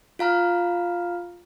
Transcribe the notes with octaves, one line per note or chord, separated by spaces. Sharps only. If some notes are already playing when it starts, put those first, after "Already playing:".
F4 F5 A#5 F6